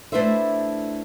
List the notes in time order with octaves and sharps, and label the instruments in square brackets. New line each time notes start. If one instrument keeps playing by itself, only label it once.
[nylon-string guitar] A3 D4 E4 B4 C5 E5